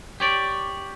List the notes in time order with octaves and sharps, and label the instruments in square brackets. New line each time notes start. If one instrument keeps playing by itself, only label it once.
[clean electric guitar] G4 C#5 D5